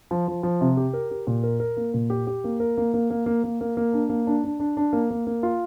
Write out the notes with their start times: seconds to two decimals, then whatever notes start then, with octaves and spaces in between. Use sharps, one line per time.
0.11 F3
0.28 F3
0.43 F3
0.61 C3
0.77 G4
0.93 A#4
1.11 G4
1.27 A#2
1.43 A#4
1.60 A#4
1.77 A#3
1.94 A#2
2.10 G4
2.27 G4
2.44 A#3
2.60 A#4
2.77 A#3
2.94 A#3
3.10 A#3
3.26 A#3
3.44 A#3
3.61 A#3
3.77 A#3
3.93 D4
4.09 A#3
4.27 D4
4.44 D4
4.60 D4
4.77 D4
4.93 A#3
5.11 A#3
5.27 A#3
5.43 F4